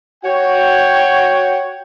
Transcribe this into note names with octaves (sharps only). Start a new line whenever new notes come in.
F#4 C#5 G5